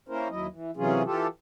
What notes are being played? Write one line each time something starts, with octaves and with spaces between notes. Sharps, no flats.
A#3 C#4 E4 A#4 C5
D#2 F#3 E4 D#5
E3
C3 E3 F#3 C#4 F4 G#4
E3 F4 G4 A4